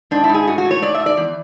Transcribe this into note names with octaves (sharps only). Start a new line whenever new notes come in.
G#2 D4
E4
G#2 G#4
A2 F#4
F#4
A2
C#5
G#2 D5
E5
G#2
D5
E2